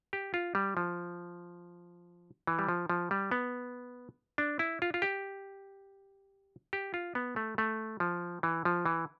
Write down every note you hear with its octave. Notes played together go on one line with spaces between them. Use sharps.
G4
F4
G3
F3
E3
G3
F3
F3
G3
B3
D4
E4
F4
F4
G4
G4
F4
B3
A3
A3
F3
E3
F3
E3